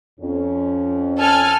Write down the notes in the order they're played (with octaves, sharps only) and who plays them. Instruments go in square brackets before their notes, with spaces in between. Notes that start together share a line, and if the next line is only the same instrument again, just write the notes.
[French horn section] F2 C#4
[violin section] A4 G#5 F6